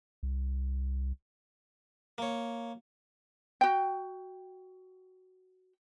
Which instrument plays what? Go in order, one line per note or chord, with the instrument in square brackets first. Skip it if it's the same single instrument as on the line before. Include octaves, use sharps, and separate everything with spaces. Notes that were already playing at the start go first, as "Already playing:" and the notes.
[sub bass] C2
[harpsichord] A#3 C#5
[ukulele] F#4 G5